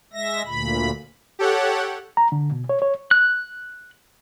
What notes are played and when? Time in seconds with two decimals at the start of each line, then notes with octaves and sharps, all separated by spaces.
0.13 G#3 E5 A#6
0.46 D2 A#2 B5
1.39 G4 A4 C#5 F#5
2.17 A#5
2.32 D3
2.52 B2
2.69 C#5
2.82 C#5
3.11 F#6